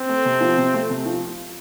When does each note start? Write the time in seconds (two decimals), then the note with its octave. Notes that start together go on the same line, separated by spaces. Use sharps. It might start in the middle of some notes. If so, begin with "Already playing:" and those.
Already playing: C4
0.09 A3
0.25 C3
0.41 F3
0.58 C3
0.74 A3
0.90 C3
1.06 F3